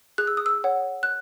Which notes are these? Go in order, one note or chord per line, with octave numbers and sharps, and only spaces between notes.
G#4 F#6
E6
D#6
E6
C#5 F#5
F#6